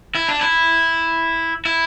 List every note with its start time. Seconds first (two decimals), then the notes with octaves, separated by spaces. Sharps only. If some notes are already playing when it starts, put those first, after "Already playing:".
0.15 E4
0.28 D4
0.41 E4
1.65 E4